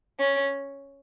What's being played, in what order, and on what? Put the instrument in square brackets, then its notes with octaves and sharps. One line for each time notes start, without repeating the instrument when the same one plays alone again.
[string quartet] C#4